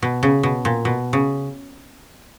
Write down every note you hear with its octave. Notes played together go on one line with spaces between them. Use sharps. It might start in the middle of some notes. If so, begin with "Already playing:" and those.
B2
C#3
B2
A#2
B2
C#3